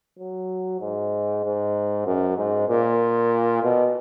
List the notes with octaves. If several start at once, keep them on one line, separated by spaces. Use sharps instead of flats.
F#3
G#2
G#2
F#2
G#2
A#2
B2